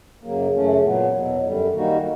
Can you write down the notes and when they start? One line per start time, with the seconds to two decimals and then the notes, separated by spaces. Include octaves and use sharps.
0.24 F#2 C#3 F#3 A#3
0.54 F#2 C#3 E3 A3 C#4
0.83 A#2 F#3 B3
1.14 E2 B2 F#3
1.44 F#2 D3 G3
1.74 D#3 G3 A#3 D#4 F#4